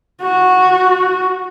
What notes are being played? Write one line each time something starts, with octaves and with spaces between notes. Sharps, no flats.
F#4